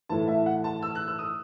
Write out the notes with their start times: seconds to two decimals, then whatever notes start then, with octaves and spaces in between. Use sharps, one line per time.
0.09 A2 E3 A5
0.28 E5
0.46 F#5
0.64 A5
0.82 E6
0.95 F#6
1.08 E6
1.19 D#6